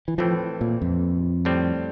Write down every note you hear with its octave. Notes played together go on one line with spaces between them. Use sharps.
E3
A2 E3 F3 A3 C4
A#2
F2
A2 G3 C4